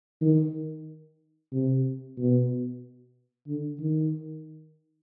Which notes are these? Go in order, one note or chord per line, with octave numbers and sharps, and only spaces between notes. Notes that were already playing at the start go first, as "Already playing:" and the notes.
D#3
C3
B2
D3
D#3